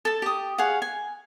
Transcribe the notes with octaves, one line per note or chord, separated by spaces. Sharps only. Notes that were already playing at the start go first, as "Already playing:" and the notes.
A4 A5
G4 D#6
G#4 C#5 F5 F#5
G#5